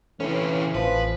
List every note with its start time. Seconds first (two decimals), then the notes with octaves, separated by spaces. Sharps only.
0.20 A2 C3 E3 C#4
0.74 A1 F3 B4